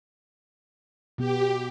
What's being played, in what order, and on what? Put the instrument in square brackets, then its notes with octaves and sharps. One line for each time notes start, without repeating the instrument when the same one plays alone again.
[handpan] B2 B3 [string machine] G4